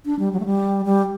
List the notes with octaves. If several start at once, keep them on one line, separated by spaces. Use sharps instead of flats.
D4
G3
F#3
A3
G3
G3